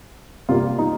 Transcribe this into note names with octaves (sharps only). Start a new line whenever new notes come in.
C3 G3 A#3 F4
D#4